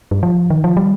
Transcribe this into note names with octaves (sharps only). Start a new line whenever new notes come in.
G2
F3
D#3
F3
G3